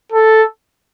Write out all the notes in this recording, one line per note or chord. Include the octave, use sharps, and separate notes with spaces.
A4